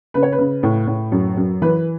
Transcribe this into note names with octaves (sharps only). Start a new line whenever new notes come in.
C#3 B4
C#5
B4
C#3
A2
A2
F#2
F#2
E3 B4